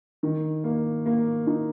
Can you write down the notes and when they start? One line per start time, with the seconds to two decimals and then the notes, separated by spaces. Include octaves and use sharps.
0.23 D#3
0.64 A#3
1.06 A#3
1.47 D#4